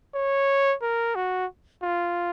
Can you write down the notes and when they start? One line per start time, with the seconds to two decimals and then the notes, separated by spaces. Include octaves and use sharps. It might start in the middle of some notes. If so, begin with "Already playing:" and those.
0.14 C#5
0.82 A#4
1.15 F#4
1.83 F4